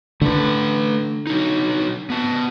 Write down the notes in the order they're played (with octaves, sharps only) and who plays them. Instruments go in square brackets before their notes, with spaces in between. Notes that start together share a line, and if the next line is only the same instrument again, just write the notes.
[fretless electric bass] D3 [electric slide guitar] A3 B4
[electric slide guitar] F#3 D#4
B3 A5